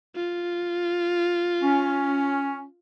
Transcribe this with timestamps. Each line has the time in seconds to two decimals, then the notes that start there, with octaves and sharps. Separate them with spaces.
0.16 F4
1.62 C#4